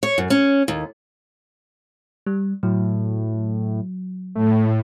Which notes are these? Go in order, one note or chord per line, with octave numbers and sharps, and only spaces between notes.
C#5
F#2
C#4
D#2
G3
A2 F#3
A2 A3